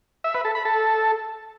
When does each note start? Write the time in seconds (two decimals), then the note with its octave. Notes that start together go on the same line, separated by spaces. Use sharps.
0.24 E5
0.35 B4
0.45 A4
0.55 B5
0.65 A4